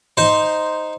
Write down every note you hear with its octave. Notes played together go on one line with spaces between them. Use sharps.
D#4 C5